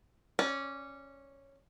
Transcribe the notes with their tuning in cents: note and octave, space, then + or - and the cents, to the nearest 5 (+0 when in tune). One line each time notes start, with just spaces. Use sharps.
C#4 -10 D5 -20